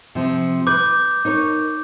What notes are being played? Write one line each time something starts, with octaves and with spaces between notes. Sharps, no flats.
C3 F3
B4 D6 G6
D#4 A#4 C#5